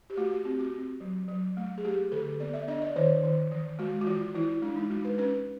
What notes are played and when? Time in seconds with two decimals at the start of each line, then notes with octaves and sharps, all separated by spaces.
0.10 G4
0.17 A3 F#4
0.27 G4
0.31 F#4
0.45 C4 G4
0.59 F#4
0.74 C4
1.00 F#3
1.28 F#3
1.57 A3
1.78 G#4
1.85 A3 G4
2.12 D3 A4
2.40 B3 D5
2.54 E5
2.68 D4 D#5
2.82 D5
2.96 D#3 C#5
3.24 D#3
3.52 E3
3.79 G#3 F#4
4.01 F#4
4.07 E3 F4
4.35 E3 E4
4.62 G#3 D4
4.76 D#4
4.90 G#3 F#4
5.05 B4
5.18 C#4 B4